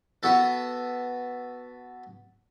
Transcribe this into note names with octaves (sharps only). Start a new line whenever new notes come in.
B3 F#4 A4